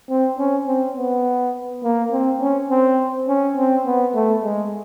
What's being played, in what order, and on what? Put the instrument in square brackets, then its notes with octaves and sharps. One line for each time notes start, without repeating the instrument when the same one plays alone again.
[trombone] C4
C#4
C4
B3
A#3
C4
C#4
C4
C#4
C4
B3
A3
G#3